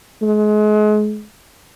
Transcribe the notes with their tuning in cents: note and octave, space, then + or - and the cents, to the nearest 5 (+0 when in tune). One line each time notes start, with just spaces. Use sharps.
G#3 +30